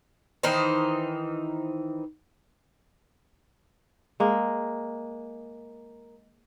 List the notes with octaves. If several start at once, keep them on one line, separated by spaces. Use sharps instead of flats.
D#3 E3 D#4 C5
G#3 A#3